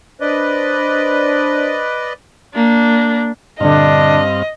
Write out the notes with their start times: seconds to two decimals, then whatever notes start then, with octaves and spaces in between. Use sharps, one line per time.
0.21 D4 B4 C5 D5 D#5
2.54 A#3 D4
3.60 G2 A#2 D3 C4 D4 D#5 F5